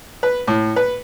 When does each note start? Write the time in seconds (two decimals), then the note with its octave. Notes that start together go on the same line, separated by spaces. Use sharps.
0.23 B4
0.48 A2
0.76 B4